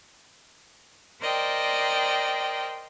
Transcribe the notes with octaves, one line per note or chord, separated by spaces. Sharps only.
A#4 C5 D5 D#5 G5